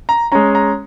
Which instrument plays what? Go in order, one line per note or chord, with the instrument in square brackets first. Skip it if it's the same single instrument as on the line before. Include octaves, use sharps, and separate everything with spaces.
[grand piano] A#5
G#3 C#4 A#5
A#5